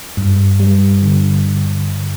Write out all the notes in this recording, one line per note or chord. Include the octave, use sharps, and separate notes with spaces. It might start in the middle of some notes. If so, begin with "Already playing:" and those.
G2
G3
D3